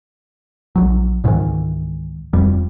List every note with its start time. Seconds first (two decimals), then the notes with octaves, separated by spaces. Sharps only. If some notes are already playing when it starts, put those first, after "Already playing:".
0.76 A#1 F#3
1.24 C#2 G#2 D#3 E3
2.33 F1 F2 G3